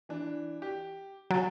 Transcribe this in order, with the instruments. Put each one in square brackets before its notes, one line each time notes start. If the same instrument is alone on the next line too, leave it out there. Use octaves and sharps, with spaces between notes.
[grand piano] E3 D4
G4
[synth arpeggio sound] F#3 [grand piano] G#5 A6 D7